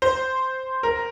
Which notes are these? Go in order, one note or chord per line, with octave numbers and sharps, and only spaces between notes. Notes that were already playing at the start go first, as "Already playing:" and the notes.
C5
A#4